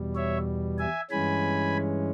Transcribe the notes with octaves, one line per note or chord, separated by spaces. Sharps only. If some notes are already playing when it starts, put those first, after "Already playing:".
Already playing: E2 B2 G3
C#5 E5
E5 G#5
G2 E3 G#3 C#4 G#5 B5